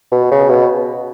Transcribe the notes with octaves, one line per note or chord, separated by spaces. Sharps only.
B2
C#3
B2